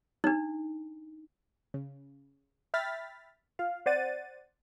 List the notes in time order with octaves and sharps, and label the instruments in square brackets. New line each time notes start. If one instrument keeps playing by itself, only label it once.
[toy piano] D4 D#4
[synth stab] C#3
E5 G5 B5 F6 A6 B6
F4 F5
C4 C5 D5 F#5 A6 D#7